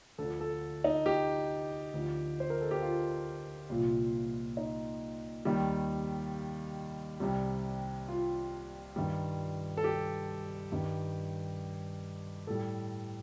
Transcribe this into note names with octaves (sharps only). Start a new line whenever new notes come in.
D2 D3 F3 A4
A4
D#4
G4
D2 D3 F3
C5
A#4
A4
G4
F4
C2 A#2 F3
D#4
D#2 D#3 G3
C2 C3 G3
F4
G2 D#3 G3
A4
G4
G2 D#3 G3
A2 G3 A4